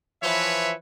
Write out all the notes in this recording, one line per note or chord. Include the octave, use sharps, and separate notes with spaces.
E3 F3 B4 C#5 E5